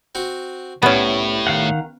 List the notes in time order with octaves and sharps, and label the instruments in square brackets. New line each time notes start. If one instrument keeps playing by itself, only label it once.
[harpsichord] C4 F#4 F#5
[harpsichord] C2 [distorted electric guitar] A2 [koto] B3 C#4
[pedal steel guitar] D#3 F5 F#5